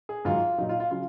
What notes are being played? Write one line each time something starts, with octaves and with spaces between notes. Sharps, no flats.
G#4
G#2 D#3 F#3 F4
A#2 F#3 D#4
F4
F4
C#3 F#3 F4